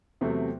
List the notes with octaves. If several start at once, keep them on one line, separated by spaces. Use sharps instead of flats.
E2 C3 F#3 A3 C4